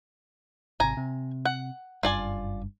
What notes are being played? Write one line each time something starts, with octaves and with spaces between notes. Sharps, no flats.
G#1 C3 G#5 A#5
C3
F#5
F#1 G2 F4 D5 G#5